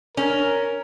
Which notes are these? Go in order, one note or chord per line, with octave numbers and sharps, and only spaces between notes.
C#4 A#4